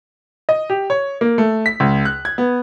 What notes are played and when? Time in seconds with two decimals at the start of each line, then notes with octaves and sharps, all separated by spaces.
0.49 D#5
0.70 G4
0.90 C#5
1.21 A#3
1.38 A3
1.66 B6
1.80 C#2
2.05 F#6
2.25 G#6
2.38 B3